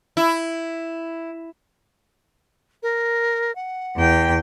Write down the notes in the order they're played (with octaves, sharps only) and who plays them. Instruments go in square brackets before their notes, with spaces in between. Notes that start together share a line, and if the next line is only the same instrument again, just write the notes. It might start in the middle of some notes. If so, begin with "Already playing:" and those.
[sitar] E4
[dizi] A#4
F#5
[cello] E2 G5